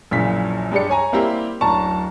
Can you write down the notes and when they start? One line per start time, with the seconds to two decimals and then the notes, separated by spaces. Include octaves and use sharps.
0.11 A#1 F#2 A#2 C#3 E3 B6
0.72 G2 G#3 G4 D5 C#7
0.90 C#5 G#5 A#5
1.12 G3 A#3 C4 E4 G4
1.61 D1 F#2 D4 A5 A#5 C#6